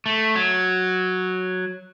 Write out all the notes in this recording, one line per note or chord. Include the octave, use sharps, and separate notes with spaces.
A3
F#3